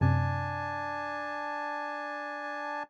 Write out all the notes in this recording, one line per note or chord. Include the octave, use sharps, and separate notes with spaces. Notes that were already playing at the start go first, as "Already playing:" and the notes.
F#2 C3 D4 G#5 A5